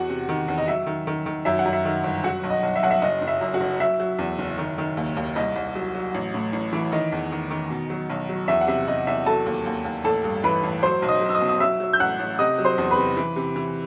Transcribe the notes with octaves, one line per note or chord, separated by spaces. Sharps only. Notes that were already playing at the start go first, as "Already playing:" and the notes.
Already playing: E2 F#4 F#5
C3
D#3
E2
D#5
F#3 E5
D#3
D#3
D#3
F#2 E5
F#5
F#2
E5
D#3
G1
F#3 F#4 F#5
B1
D#5
B1
E5
B1 F#5
E5
F#1 D#5
F#1
E5
F#2
F#4 F#5
F#1
F#3 E5
F#3
E2
F#1
D#3
D#3
D#2
D#2
C2 D#5
C2
F#3
F#3
A1
A2
A1
E3
D#3 D#5
E2
D#3
D#3
B2
F#3
B1
F#3
E2 E5
F#5
C3 E5
C3 D#5
E2 E5
F#3 A4 A5
D#2
D#2
D#2
A1 A4 A5
G2
E3 B4 B5
A1
F#3 C5 C6
B1
D#5 D#6
F#3
E6
D#5 D#6
B2
D#6
F#3 E5 E6
F#3
G6
A1 F#5 F#6
A1
C3 D#5 D#6
F#3
C5 C6
E2
B4 B5
C3
E3
C3
E3